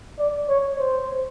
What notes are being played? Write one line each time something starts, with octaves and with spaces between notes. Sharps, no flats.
D5
C#5
C5